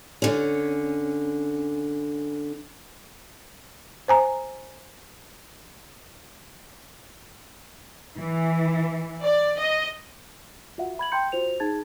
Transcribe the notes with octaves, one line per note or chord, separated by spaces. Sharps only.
D3 C#4
C5 G#5 A#5
E3
D5
D#5
F4 F#4 E5 F#5
B5 G#6 F#7
G5 A#5 C6 G6 C#7
F4 F#4 C5 F7
D#4 G#4 A5 G#6 A6